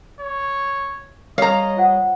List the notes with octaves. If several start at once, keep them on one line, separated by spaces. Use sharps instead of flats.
C#5
G3 C#5 D#5 F5 A#5
F4 C5 F#5